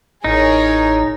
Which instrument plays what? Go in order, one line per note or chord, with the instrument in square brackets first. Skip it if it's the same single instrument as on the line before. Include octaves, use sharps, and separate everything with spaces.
[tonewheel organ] A1 A2 E4 [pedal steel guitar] D#4 [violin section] G#4 A#4 C#5